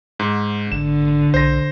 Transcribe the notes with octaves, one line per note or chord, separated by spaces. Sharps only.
G#2
G#1 D3 E7
B1 C5 A#6